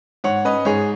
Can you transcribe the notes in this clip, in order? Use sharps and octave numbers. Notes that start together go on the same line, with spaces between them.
G#2 C#5 F#5
C#4 B4 D#5
G#2 G#4 C#5